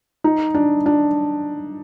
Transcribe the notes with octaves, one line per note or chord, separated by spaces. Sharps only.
D#4
D4
D4